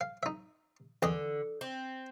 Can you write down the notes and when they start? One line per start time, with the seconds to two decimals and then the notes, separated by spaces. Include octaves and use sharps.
0.01 F5
0.23 D#4 E5
1.02 E2 D3 D#5
1.61 C4